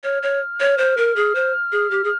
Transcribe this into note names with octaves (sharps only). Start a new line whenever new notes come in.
C#5 F6
C#5
C#5
C5
A#4
G#4
C5
G#4
G4
G#4